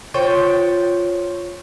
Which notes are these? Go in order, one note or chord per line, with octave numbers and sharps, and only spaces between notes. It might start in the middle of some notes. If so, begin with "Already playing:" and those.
F4 C5 C#5 G5